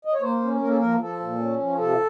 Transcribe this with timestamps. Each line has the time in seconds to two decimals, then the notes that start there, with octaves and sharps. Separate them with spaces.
0.05 D#5
0.13 C#5
0.22 A#3 C5
0.42 C#4
0.61 A#3 A#4
0.69 A4
0.78 F3 A#4
1.00 F3 A4
1.20 A#2
1.39 C#4
1.58 F3
1.78 C3 A4